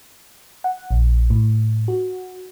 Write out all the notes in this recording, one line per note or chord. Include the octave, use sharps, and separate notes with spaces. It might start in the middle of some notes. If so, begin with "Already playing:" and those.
F#5
A#1
A2
F#4